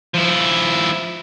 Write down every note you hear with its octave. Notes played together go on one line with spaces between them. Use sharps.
F3 E4